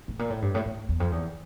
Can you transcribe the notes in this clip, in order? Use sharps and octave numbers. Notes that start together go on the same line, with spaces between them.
A2
A#2
A2
G2
A2
A2
E2
F2
E2